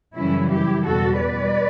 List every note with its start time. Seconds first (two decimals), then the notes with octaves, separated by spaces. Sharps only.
0.16 F#2 C#3 E3 G3 C#4 E4
0.50 E4 G4
0.85 E2 B2 G3 F#4 A4
1.19 B4 D5